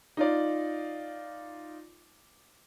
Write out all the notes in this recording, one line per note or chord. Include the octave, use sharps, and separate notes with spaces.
D#4 F4 D5